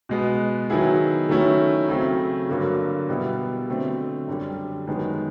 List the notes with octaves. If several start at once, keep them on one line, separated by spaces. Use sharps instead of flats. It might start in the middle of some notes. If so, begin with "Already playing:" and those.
B2 G#3 B3
D#3 F#3 B3 E4 G#4
D#3 F#3 A3 C#4 E4
C#3 F#3 A3 C4
G2 D3 F#3 A#3
B2 G3 B3 E4
D3 F#3 A3 C4
F#2 D3 G3
F#2 D#3 G#3 B3